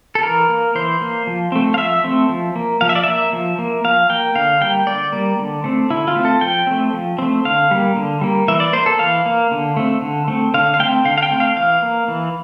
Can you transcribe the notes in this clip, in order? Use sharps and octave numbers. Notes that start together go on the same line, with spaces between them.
A4
E3 A#4
A#3
E3 C5
A#3
F3
A3 C4
F5
F3 E5
A3 C4
F3
A#3
F3 F5
E5
D5
A#3 E5
F3
A#3
F3 F5
A#3 G5
D3 F5
G3 A#3 G5
D3 D5
G3 A#3
D3
A3 C4
D3 E4
F4
A3 C4
A4
F3 G5
A3 C4
F3
A3 C4
D3 F5
G3 A#3
D3
G3 A#3
E3 E5
D5
A#3 C5
A4
E3 F5
A#3
D3
A3 C4
D3
A3 C4
D3 F5
F5
A3 C4 G5
D3 F5
F5
G5
A3 C4
F5
E3 F5
A#3
E3